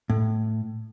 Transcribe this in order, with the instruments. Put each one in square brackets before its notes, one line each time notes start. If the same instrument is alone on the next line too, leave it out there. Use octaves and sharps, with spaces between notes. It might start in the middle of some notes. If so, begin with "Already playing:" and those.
[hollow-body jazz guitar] A2